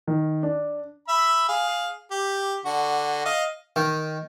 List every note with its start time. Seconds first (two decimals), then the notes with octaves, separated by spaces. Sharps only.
0.07 D#3
0.43 D4
1.08 E5 B5
1.48 G#4 F5
2.11 G4
2.65 D3 F#4
3.25 D#5 F5
3.76 D#3